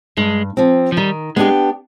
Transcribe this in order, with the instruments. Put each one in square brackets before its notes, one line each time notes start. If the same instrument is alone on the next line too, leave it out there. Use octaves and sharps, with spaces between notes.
[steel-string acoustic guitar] G2 [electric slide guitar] G#3
[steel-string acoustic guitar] F3 C4
[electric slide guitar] F3
[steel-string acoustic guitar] D#3 [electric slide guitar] G3
[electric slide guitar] G#3 [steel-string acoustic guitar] B3 D4 G4